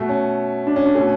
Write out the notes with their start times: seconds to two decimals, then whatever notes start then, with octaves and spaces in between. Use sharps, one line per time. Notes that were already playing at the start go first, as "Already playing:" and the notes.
Already playing: B2 A3
0.09 C#4
0.67 D4
0.76 C#4
0.86 D4
0.95 B2 A3 C#4